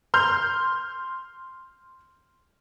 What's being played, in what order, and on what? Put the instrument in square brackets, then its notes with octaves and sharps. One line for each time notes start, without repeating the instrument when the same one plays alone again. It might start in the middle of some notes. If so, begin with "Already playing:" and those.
[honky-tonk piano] C6 F6 G6